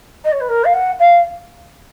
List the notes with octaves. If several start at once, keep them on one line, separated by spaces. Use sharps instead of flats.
D#5
C#5
B4
A#4
F5
F#5
F5